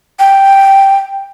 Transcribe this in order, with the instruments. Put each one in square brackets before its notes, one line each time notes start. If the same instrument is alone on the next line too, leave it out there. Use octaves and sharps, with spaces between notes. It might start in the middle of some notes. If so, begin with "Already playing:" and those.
[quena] G5